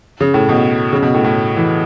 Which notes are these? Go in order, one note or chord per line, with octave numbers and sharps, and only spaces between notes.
C#3
A2
B2
C#3
B2
A2
A2
E3